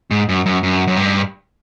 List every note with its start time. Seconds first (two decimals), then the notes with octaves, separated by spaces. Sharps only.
0.11 G#2
0.29 F#2
0.46 F#2
0.63 F#2
0.87 F#2
0.97 G2